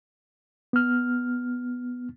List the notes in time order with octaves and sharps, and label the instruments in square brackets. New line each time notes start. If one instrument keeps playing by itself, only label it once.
[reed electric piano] B3 F6